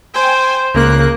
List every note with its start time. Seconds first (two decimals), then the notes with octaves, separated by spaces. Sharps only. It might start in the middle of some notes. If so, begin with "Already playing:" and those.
0.14 C5 G5 G#5
0.74 C#2 C#3 A#3 F#6